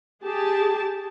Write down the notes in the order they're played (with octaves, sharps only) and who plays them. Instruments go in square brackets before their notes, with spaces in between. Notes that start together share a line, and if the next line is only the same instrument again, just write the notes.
[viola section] G4 G#4 A5